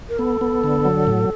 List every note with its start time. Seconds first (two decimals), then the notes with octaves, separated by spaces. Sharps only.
0.09 A#4
0.19 B3 A4
0.41 B3
0.64 D3
0.85 F#3
1.07 A2